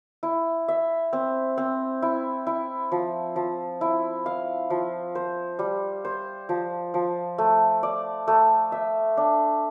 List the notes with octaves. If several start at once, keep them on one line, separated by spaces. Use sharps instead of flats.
E4
E5
C4
C4
E4
E4
F3
F3
E4
F5
F3
C5
G3
C5
F3
F3
A3
D5
A3
E5
D4